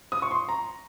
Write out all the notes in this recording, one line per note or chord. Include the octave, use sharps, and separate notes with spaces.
D#6
C#6
C6
A#5